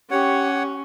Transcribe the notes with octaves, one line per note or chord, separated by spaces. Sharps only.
C#4 G4 C#5 F#5